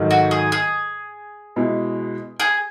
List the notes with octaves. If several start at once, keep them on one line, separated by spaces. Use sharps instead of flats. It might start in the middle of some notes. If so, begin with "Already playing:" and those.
Already playing: G#2 D#3 F#3 A3
F#4
G#4
G#4
B2 G#3 B3 E4
G#4